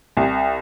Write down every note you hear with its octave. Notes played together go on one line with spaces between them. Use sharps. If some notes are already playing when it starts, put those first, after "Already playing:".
C2